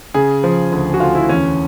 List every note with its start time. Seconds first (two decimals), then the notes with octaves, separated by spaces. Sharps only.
0.14 C#3 G#4
0.44 F3
0.72 D2
0.94 F#4
1.00 D2 F4
1.15 E4
1.28 E2 C#4